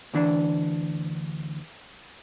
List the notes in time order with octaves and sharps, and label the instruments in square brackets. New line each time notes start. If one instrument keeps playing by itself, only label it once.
[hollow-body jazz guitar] D2 E3 D4